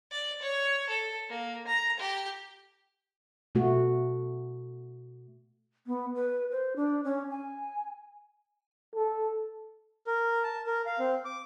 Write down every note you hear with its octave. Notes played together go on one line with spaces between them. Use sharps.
D5
C#5
A4
A#3
A#5
G4
B2 A3 F#4
B3
B4
C5
D4
C#4
G#5
A4
A#4
A5
A#4
F5
C4
D6